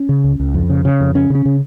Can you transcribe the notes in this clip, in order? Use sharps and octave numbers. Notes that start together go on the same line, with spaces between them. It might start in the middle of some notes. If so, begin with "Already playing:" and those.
Already playing: C#4
C#3
C#2
C#2
F2
C#3
C#3
F2
C#3 C#4
C#3 C#4
C#3